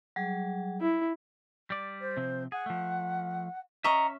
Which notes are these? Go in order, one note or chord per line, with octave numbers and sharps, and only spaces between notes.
F#3 G3 G#4
E4
G3 D5
C5
C3 F3 C4
G#4 F#5
F3 A3
C#4 D#5 E5 A#5 C#6